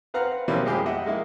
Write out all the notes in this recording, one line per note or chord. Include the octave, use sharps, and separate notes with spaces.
C4 B4 F5 F#5 A#5 F6
B2 E3 G3 A#3 C4 C#4
F2 F3 G#3 A#3 G4 G#4
G4 D#5 E5 F#5
G#3 A#3 E4